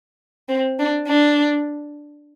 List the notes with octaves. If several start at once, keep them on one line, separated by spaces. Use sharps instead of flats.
C4
D4
D4